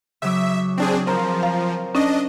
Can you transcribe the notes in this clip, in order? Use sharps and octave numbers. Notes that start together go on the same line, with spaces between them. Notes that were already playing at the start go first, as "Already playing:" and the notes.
C#3 F#3 E5 D6
C4 D4 G#4
F3 C4 A#4 A#5
F5 A#5
C#4 D4 D#5